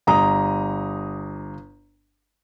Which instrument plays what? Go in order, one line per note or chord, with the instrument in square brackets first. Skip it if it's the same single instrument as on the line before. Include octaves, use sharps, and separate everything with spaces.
[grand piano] G1 A#5 D#6